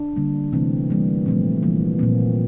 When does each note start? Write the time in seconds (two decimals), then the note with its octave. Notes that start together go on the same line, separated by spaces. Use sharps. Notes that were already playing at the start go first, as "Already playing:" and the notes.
Already playing: D4
0.16 D3 G3 A#3
0.53 C3 E3 A3 C4
0.89 C3 E3 G3 A#3
1.26 A#2 F3 A3 C4
1.63 E3 G3 A#3
1.99 A#2 F3 A#3 C4